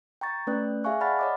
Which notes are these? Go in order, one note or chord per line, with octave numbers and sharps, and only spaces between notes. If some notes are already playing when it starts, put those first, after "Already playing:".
G5 A#5 C#6 A6
A3 C#4 B4 D5 G5 F#6
G#4 E5 F5 G#5 C#6 F#6
D5 F#5 A5 B5 F6 A6
C#5 D#5 D6